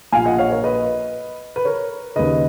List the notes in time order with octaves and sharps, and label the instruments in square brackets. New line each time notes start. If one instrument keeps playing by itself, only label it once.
[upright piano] A#1 A#2 F5 G#5
D#5 F#5
C#5 F5
A#4 C#5
B4 D#5
B4
A#4 C#5
D#2 C#3 B4 D#5